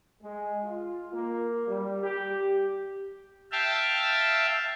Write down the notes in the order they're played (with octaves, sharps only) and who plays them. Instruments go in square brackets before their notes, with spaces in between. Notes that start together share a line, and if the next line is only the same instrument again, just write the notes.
[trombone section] G#3
F4
A#3
G3
G4
[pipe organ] E5 F5 G5 A5